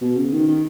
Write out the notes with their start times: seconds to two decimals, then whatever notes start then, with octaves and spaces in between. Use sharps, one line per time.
0.01 B2
0.17 C#3
0.32 D#3
0.47 D#3